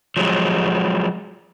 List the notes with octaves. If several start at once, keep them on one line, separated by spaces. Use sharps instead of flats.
F3 F#3 G#3